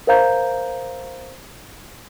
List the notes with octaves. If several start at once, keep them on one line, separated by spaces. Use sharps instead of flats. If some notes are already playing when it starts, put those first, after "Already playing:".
A#4 C5 E5 F5 A#5 G6